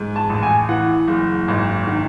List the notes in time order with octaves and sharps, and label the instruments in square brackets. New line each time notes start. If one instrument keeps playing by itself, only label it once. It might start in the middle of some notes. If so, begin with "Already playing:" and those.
Already playing: [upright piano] G#2
A5
A1
G#5
E3 F#5
F#1
G#1
D#3